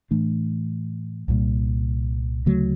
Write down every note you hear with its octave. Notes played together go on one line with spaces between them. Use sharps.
A2 E3 A3 D4
C2 A#2 G3 A#3
D2 C#3 F#3 A3